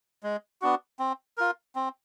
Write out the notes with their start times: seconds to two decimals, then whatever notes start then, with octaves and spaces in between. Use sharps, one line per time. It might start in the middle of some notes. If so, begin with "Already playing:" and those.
0.23 G#3
0.62 B3 D4 F#4
0.99 C4
1.38 F4 A#4
1.75 C4